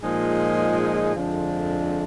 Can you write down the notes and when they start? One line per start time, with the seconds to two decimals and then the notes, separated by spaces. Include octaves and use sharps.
0.01 A#2 F3 G#3 D#4 G#4
1.15 F2 D3 F3 G#3 D4